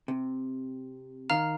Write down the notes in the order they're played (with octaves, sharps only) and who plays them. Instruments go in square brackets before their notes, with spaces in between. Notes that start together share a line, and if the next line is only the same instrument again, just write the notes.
[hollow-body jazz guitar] C3
[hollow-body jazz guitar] D#3 [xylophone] F5 A#5 F6